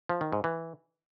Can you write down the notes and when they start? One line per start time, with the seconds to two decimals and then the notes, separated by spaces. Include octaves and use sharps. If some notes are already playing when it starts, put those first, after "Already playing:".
0.09 F3
0.21 D#3
0.32 G#2
0.44 E3